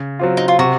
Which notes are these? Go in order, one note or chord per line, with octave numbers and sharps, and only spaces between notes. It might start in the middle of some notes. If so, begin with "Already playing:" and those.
Already playing: C#3
F#3 C4 F4
D#4
F4
C3 F#4